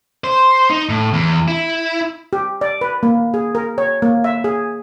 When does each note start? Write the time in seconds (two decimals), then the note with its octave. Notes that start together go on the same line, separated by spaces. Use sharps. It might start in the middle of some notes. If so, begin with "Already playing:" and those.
0.24 C5
0.70 D#4
0.89 A2
1.13 E2
1.48 E4
2.33 G4
2.61 D5
2.81 B4
3.03 A#3
3.34 G#4
3.55 A#4
3.78 C#5
4.02 A#3
4.24 E5
4.44 G#4